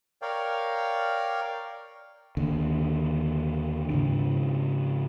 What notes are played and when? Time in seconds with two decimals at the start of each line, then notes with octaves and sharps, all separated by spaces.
0.22 A#4 C#5 D5 F5 G5
2.37 D#2 D3
3.90 G#2 C#3 D4